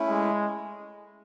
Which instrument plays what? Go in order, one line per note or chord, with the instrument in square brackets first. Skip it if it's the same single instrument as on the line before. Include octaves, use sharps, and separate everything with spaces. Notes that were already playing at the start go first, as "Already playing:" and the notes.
Already playing: [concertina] A3 C#4 E4
[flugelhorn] G#3